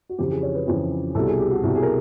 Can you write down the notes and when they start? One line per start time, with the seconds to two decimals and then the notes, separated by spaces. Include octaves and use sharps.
0.09 F#4
0.18 F2 C#3 E3 G4
0.31 G#4
0.43 C#5
0.55 B4
0.67 F2 C#3 E3
1.15 C2 B2 G3 A4
1.27 G#4
1.39 G4
1.51 F#4
1.63 C2 B2 G3
1.75 G#4
1.83 A#4